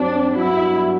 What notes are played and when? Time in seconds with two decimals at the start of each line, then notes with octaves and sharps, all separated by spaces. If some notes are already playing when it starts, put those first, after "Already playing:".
Already playing: G2 F#3 C4 D4
0.35 G2 F#3 B3 D4 E4 F#4